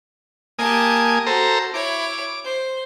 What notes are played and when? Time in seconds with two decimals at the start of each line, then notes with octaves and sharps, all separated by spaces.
0.59 A#3 G4 G#5 A5 D#6
1.26 F#4 A4 C5 A#5
1.74 E4 C#5 D6
2.44 C5